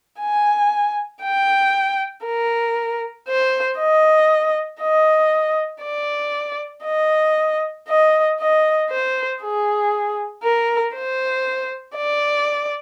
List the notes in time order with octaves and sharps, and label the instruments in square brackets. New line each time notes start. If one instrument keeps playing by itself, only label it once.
[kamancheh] G#5
G5
A#4
C5
D#5
D#5
D5
D#5
D#5
D#5
C5
G#4
A#4
C5
D5